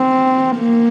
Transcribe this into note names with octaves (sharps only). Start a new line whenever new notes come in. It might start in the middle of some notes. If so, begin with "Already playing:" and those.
Already playing: C4
A#3